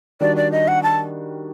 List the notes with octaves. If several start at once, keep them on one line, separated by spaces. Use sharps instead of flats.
D#3 G3 D4 F#4 D5
D5
D#5
F#5
A5